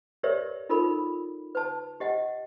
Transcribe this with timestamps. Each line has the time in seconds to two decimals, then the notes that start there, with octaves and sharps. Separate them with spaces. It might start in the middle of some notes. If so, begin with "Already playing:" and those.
0.23 G4 A#4 B4 C#5 D5 E5
0.69 D#4 F4 A4 A#4 B5
1.55 B4 A5
2.00 G4 D#5 F#5 G#5